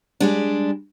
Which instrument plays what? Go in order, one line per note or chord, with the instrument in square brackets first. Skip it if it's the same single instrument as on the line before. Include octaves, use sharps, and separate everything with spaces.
[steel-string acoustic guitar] G3 G#3 D4